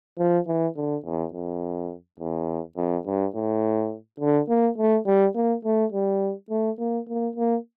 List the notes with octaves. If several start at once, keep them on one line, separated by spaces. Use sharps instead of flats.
F3
E3
D3
E2
F2
E2
F2
G2
A2
D3
A#3
A3
G3
A#3
A3
G3
A3
A#3
A#3
A#3